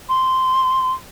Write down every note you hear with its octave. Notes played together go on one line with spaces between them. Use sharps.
C6